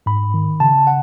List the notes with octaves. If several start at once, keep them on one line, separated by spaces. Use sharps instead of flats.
G#2 B5
D#3
C#3 A5
F#5